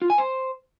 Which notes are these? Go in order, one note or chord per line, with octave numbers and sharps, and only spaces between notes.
F4
G#5
C5